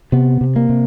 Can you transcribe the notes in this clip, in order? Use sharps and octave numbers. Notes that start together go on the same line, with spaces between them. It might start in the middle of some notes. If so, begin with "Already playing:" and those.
C3 B3
C3
A#3
C3